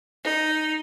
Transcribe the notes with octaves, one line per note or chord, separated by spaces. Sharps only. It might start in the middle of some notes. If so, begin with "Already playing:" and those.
D#4